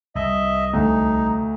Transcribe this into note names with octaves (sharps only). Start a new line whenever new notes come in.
C2 D#5 E5
D2 D#4